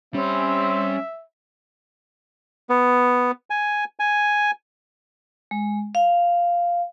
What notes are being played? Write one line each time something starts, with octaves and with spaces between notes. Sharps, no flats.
G3 C4 C#4 E5
B3
G#5
G#5
G#3
F5